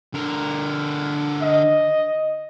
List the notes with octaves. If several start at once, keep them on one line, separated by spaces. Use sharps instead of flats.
D3 A#4
D#5